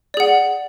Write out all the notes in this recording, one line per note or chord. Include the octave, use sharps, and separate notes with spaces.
G#4 D5 F#5